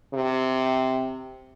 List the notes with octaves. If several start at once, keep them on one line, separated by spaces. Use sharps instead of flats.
C3